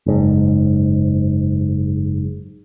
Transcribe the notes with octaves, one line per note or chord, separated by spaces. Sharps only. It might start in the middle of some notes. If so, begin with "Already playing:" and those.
F#1 G#2